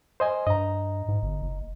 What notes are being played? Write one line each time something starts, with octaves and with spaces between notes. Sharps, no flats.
C5 D#5 G#5
G2 D#5 A#5
G#2
G1
F#1